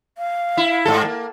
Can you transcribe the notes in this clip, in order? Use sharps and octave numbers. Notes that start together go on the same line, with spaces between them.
F5
E4
G#2 A4
A#3